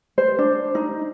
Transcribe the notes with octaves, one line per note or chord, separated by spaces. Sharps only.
C5
D4
D#4